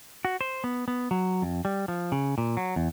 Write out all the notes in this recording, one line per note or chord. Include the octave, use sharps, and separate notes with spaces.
F#4
C5
B3
B3
F#3
F2
G3
F3
C#3
A#2
F#3
E2